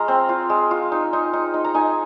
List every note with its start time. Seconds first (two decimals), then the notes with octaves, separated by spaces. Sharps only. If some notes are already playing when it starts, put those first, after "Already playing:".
Already playing: G#3 F4 F5 A#5 C6
0.08 C4
0.29 F4
0.50 G#3
0.71 F4
0.92 D#4
1.13 D#4
1.33 D#4
1.54 D#4
1.65 A#5
1.74 D#4 G#5